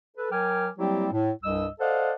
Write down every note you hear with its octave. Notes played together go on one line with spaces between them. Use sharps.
A4 B4
F#3 A#4 G5 G#5 D6 F6
F#3 G3 A#3 C4 E4 G4
A2
C2 G2 G3 D#5 E6
A4 C5 D5 D#5 F5 F#5